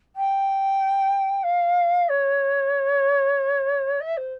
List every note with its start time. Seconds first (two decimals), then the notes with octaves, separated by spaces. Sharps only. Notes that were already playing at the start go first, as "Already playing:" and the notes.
0.16 G5
1.44 F5
2.09 C#5
4.01 E5
4.17 C5